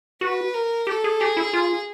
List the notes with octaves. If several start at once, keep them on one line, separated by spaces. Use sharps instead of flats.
F#4 B4
A#4
G4 A4
G#4
G4 G#4
E4
F4